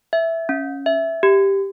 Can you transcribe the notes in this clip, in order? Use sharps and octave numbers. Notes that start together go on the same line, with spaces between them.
E5
C#4
E5
G4